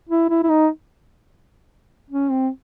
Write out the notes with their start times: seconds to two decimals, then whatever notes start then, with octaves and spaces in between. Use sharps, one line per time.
0.09 E4
0.30 E4
0.43 E4
0.49 D#4
2.11 C#4
2.30 C4